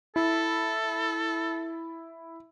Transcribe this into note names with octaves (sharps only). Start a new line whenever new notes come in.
E4 A4